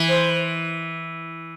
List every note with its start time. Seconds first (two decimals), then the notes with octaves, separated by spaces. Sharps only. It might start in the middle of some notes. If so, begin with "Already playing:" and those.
Already playing: E3
0.08 C5